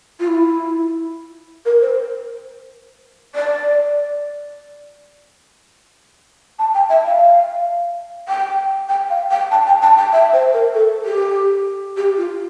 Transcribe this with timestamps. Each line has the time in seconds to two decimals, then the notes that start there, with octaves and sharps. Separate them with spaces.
0.20 F4
0.28 E4
1.65 A#4
1.81 C5
3.35 D5
6.59 A5
6.74 G5
6.90 E5
7.05 F5
8.28 G5
8.89 G5
9.10 F5
9.31 G5
9.51 A5
9.66 G5
9.82 A5
9.97 G5
10.13 E5
10.33 C5
10.53 A#4
10.74 A4
11.05 G4
11.97 G4
12.17 F4